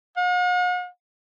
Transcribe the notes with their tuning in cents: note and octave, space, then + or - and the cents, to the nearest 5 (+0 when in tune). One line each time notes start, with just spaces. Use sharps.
F#5 -45